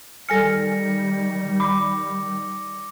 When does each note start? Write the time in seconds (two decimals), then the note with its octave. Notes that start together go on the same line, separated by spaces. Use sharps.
0.29 D#3 G3 A4 G#5 F6 A#6 C#7
1.60 B5 D6